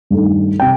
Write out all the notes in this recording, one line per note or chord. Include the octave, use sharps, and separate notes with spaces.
G2 D#3 A3
C3 G5